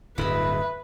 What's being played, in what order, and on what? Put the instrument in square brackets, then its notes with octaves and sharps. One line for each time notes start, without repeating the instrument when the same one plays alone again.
[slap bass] D1 G2 [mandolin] E4 D#5 [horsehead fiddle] B4